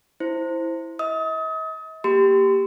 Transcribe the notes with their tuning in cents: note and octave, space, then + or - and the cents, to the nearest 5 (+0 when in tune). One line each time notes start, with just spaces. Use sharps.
E4 +0 C5 +0
D#5 +45 D#6 +35
A#3 +0 G4 +0 C6 -35